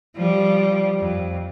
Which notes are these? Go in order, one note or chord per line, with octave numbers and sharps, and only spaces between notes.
F3 G3
F2